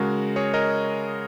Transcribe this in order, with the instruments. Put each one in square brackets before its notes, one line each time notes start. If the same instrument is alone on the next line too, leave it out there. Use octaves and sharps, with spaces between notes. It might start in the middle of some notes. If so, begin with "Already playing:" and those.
Already playing: [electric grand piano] C#3 G#3 F#4 A#4
G#4 C#5
A#4 D#5